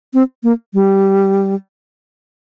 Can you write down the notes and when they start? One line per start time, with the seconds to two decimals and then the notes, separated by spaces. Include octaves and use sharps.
0.14 C4
0.43 A#3
0.74 G3